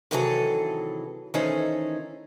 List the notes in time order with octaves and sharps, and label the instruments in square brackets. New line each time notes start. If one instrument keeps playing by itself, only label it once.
[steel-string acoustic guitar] C3 D#3 E3 F#3 G#4 A4
D#3 E3 A3 C#4 D#4 C5